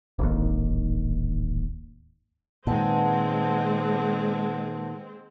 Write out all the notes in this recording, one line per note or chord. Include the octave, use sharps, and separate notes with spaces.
D1 G#1 D#2
A#2 D#3 G#3 C4 B4 F#5 A5